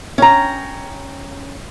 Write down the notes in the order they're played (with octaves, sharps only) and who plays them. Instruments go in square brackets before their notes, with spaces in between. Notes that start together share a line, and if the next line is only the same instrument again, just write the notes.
[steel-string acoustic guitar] C#4 G5 A#5